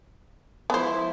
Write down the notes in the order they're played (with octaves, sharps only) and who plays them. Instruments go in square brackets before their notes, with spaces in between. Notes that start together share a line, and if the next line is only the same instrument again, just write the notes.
[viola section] F3 G#3 E4 [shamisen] B3 C5